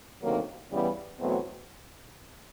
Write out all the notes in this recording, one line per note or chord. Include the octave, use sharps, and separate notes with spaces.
D2 C3 D#3 F#3 A#3
E2 C#3 E3 G3 B3
E2 B2 F#3 A3 C4